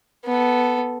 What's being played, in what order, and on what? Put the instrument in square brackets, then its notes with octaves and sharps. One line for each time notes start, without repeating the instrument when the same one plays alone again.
[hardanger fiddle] B3 A4